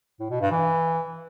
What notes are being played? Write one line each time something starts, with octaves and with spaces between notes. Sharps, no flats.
A2
B2
G2
E3